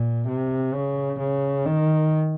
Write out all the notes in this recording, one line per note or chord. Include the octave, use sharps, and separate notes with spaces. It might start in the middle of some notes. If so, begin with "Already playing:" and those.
Already playing: A#2
C3
C#3
C#3
D#3